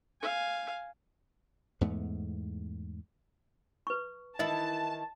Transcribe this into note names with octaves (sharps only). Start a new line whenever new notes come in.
F5 G#5
E2 G#2 A3 B3
B4 C#6
D#3 E3 E4 D#5 A5